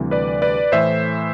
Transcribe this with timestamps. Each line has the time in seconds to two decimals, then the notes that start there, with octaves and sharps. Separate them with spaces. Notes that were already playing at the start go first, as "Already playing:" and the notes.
Already playing: D2 C3 E3 G3
0.11 B4 D5
0.42 B4 D5
0.72 A2 E3 A3 C5 E5